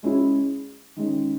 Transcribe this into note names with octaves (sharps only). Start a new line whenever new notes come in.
G#3 C#4 E4 G#4
D#3 G#3 C#4